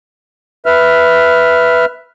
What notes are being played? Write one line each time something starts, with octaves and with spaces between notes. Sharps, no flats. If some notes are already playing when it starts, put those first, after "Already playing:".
B4 E5 F6